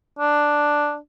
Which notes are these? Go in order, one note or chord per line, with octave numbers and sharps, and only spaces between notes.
D4